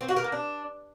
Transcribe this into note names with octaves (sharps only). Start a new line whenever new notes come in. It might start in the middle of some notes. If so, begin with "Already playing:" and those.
C4
F#4
A#4
A#3
D4